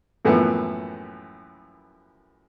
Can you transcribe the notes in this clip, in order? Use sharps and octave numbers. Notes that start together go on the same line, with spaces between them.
F#2 A2 E3 F3 A#3 B3